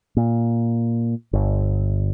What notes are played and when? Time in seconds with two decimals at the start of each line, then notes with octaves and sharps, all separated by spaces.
0.17 A#2
1.33 G1